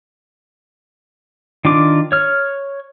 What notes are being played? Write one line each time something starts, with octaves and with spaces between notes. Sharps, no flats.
D#3 D4 F4 D6
C#5 F6